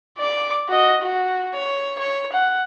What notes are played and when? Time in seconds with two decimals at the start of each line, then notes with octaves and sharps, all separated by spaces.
0.18 D5 D6
0.69 F#4 D#5
1.02 F#4
1.53 C#5
1.99 C#5
2.33 F#5